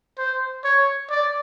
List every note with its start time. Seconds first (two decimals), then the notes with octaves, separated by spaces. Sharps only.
0.18 C5
0.64 C#5
1.10 D5